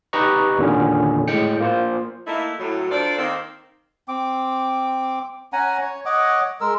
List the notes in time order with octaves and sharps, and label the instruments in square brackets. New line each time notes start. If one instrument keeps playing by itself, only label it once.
[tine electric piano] D#4 G4 B4 D#5 A#5 C#6
E2 A#2 D3 D#3 C#4
A2 G#3 G5 C#7
A#3 F4 C5
[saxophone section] A3 A#3 D#4 E4
A2 F#3
D4 F4 A4 A#4 C5 D5
D#3 A#3 C4
[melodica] C4 D6
C#4 F#5 G#5 A#5
C#5
C#5 D#5 F#5 D6
G#3 A#4 E6